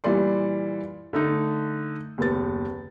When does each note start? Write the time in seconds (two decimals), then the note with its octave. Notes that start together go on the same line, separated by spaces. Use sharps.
0.04 A#2 E3 G3 D5 C6
1.13 D3 A3 D#4
2.18 F#1 D#2 B3 A6